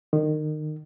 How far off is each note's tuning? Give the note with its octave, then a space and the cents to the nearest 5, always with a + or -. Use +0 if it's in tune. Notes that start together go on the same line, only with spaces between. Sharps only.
D#3 -25